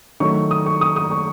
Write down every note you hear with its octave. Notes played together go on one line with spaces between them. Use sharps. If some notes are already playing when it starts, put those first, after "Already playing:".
D#3 F#3 A3 C#6
D#6
C#6
D#6
D#6
C#6